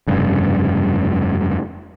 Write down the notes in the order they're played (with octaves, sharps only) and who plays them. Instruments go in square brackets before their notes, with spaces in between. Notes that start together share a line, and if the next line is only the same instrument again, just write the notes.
[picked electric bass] F1 G2 C#3